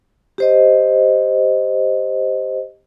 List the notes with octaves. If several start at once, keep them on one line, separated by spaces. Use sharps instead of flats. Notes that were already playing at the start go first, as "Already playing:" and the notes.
G4 C5 D#5